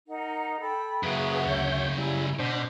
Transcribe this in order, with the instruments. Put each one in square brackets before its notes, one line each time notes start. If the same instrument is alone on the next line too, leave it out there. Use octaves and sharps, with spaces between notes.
[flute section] D#4 A#4 F#5
A4 G5 B5
[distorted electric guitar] F#2 C#3 [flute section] F#4 E5 [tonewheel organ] G#4 B4
[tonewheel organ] D2 C#5 G6
[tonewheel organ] G3 E4 [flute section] G#5
[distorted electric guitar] B2 [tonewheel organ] D4 C5